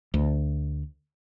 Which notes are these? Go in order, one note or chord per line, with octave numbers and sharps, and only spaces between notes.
D2